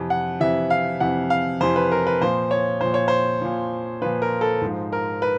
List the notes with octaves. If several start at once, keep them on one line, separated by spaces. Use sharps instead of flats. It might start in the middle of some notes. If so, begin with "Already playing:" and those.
Already playing: F2 C3 E3
F#5
F2 C3 E3 E5
F5
F2 C3 E3 F#5
F5
F2 C3 E3 C5
B4
A#4
B4
A#2 F3 C5
C#5
A#2 F3 C5
C#5
C5
A#2 F3
A#2 F3 B4
A#4
A4
G#2 F3
A#4
B4